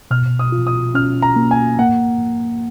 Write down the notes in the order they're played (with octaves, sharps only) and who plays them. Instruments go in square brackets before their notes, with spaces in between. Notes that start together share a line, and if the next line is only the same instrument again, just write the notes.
[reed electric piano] B2 [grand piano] F6
[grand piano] D#6
[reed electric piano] F4
[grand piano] D#6
[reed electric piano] C#4 [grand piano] F6
[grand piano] A#5
[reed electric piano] A#3
[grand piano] G#5
[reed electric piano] A#3 [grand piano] F#5